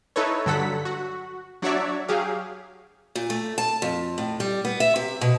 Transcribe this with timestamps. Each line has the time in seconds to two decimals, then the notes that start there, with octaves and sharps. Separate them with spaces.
0.16 D#4 E4 A4 B4 C#5
0.46 G2 D3 F#3 A4 F#5 B6
0.85 F#4
1.62 F#3 D4 F#4 C#5 D5 E5
2.08 F#3 G4 G#4 F5
3.15 A#2
3.30 A3
3.58 A5
3.82 F2
4.18 A2
4.40 G3
4.65 B3
4.80 E5
4.96 C3
5.21 B2